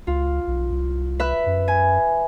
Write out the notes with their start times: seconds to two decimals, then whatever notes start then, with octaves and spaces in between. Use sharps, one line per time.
0.07 C#2 F4
0.47 B1
0.71 C2
1.20 B4 E5 F#6
1.46 F#2
1.68 G#5